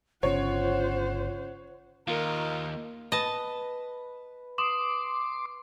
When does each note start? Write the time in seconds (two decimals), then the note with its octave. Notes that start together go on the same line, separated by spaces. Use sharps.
0.23 G1 C#3 C#4 F4 C5 C#5 F#5
2.07 D#2 F4 A#4 D#5
3.12 B4 D#5 A5
4.58 C6 D6 D#6 E7 F#7